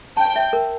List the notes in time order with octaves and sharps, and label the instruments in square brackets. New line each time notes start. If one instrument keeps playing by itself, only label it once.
[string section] G5 [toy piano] A5
[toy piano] E5
A#4